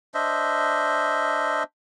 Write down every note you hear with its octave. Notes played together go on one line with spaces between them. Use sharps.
D4 C5 D#5 E5